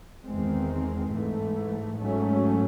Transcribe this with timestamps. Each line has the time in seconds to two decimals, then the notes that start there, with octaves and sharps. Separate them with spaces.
0.25 E2 D#3 G#3 C4
1.12 G#2 E3 A3
1.99 G#2 F#3 A3 C#4